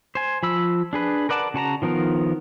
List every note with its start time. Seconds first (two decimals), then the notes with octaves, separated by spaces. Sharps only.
0.15 C5 G#5
0.43 F3 B5 E6
0.93 D4 G#4 B4
1.29 A#4 B4 D5 F#5 A5
1.54 C#3 F#4 A5 A#5
1.82 D#3 F3 B3 A#4